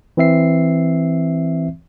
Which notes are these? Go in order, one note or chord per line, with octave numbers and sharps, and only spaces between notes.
E3 C4 E5 C7